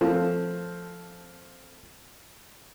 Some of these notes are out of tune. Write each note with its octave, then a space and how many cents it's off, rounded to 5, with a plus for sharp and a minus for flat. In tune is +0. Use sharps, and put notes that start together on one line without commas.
F3 +0 A3 +0 C4 +0